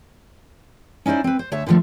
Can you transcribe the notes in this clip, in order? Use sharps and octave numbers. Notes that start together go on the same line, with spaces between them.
C#4 D#4 E4 C5 D5
C4 B4
C5
D2 C#5 E5 A5
D3 D#3 F3 F#3 A3